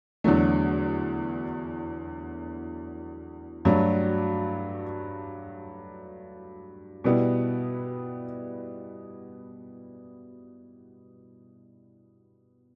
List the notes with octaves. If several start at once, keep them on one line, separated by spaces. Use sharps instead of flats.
E2 D3 F#3 A3
G2 F#3 A3 D4
B2 G3 B3 E4